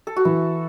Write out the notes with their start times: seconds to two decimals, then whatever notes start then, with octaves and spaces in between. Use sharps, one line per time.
0.07 A4
0.16 F#4
0.25 E3 E4